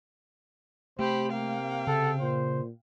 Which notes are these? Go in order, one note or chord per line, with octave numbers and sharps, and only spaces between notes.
C3 A3 G4 C5 B5
A#3 F5 G5
C#3 A4
A#2 C5